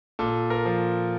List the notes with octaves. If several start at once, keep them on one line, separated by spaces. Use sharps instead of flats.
A#2 A4
A#4
F3